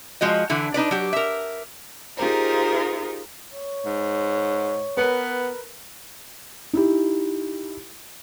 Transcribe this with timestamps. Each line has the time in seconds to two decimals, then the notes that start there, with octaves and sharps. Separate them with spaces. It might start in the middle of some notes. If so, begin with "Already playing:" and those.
0.21 F3 G#3 F#4 D#5
0.50 D3 E3 E4
0.74 D4 D#4 B4 D5
0.91 F#3 G4
1.13 A#4 E5
2.17 D#4 F4 G4 G#4 A#4 C5
3.52 C#5
3.85 G#2
4.97 B3 A#4 B4
6.73 D#4 E4 G4